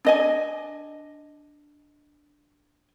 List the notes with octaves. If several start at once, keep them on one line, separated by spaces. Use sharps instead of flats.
D4 D#5 G#5